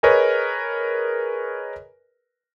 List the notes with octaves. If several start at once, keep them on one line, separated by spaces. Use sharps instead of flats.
G#4 A#4 B4 C#5 D#5 G#5